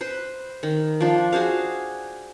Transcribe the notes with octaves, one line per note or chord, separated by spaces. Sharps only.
B4 C5
D#3
F3 D4
F#4 G#4 C5 F5